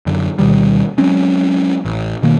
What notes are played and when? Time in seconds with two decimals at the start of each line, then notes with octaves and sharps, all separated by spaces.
0.06 F#2 D3
0.39 D2 B2 D#3 G3
0.98 F#3 G#3 C4 C#4
1.85 A1
2.23 B2 D#3 A#3